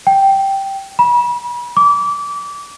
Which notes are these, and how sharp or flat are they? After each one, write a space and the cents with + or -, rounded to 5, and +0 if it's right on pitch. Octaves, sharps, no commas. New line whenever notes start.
G5 -5
B5 -35
D6 -25